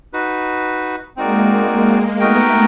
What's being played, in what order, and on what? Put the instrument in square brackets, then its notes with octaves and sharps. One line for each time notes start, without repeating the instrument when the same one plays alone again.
[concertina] D#4 F#4 B4
[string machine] G#3 A#3 [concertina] C4 D#4 F#4 A#4 D5
[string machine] A3 B3 [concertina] D#4 F#4 A#4 D#5 G5